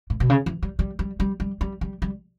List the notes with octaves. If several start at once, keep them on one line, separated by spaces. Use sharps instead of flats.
A2
B2
C#3
E3
G3
G3
G3
G3
G3
G3
G3
G3